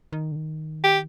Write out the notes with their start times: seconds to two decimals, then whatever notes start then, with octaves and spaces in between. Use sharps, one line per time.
0.13 D#3
0.32 D3
0.36 D#3
0.84 G4